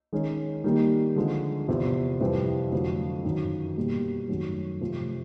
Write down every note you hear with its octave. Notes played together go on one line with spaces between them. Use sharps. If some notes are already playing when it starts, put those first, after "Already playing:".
D#3 G#3 C#4
D#3 G3 A#3 D#4
D3 F3 G#3
E2 C3 F3
F2 C3 E3 G3 C4
F2 D3 F#3 A3
F#2 D#3 F#3
B2 G3 A#3
F#2 D#3 F#3 A3 C#4
C3 F3 A3 C4